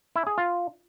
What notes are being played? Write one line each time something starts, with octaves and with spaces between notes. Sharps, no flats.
E4
G#4
F4